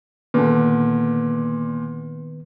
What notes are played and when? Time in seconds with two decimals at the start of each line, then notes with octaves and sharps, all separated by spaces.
0.34 A#2 D3 D#3 B3 B4